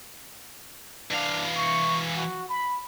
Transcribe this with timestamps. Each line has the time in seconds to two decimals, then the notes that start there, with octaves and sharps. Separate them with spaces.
1.11 E3 D4 F5
1.56 C#6
2.15 F#4
2.49 B5